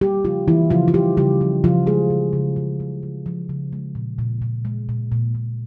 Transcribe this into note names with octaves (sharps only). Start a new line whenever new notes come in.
G3 A#3 G4
C#3 F3 F4
E3 A#3 E4
C#3 F3 F4
F4
C#3 G3 G4
C#3 G3 G4
F3
C#3 F3 F4
C#3 G#3 G#4
C#3
C#3
C#3
C#3
C#3
F3
C#3
G#3
A#2
A#2
A#2
G#3
A#2
A#2
A#2